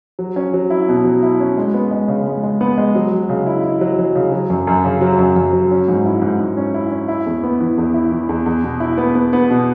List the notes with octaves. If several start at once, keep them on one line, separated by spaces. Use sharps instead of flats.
F#3
C#4
F#3
E4
B2
F#3
E4
C#4
G#3
B3
G#3
C#3
G#3
G#3
B3
G#3
F#3
F#3
C#3
E4
E4
F#3
F#3
C#3
F#3
F#2
F#2
C#3
F#3
F#2
F#2
F#3
C#4
G#2
E4
G#2
G#2
C#4
E4
C#4
E4
E2
B3
E3
E2
E4
E3
E2
E2
B2
E4
B3
B3
B3
B2